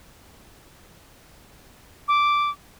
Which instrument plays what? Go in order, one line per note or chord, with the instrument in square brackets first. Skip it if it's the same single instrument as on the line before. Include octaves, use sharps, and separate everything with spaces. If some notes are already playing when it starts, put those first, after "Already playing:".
[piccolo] D6